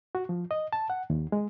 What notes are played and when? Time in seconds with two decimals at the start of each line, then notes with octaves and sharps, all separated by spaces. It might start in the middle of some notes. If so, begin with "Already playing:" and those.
0.15 F#4
0.29 F3
0.51 D#5
0.73 A5
0.90 F#5
1.10 D#2
1.32 G#3